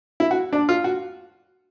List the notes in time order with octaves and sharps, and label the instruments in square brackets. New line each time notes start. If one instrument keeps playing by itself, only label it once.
[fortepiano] E4
F#4
D4
F4
F#4